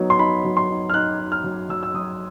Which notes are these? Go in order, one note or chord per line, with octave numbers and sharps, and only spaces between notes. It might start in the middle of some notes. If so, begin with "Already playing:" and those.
Already playing: F#3 B3 D#4
C6
D#4 B5
F#3
C6
D#4
F6
D#4 F#6
D#4
F6
F#3
F#3 E6
E6
F#3 D#6